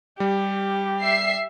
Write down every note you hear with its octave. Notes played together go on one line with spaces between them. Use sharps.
G3 G4
E5 C7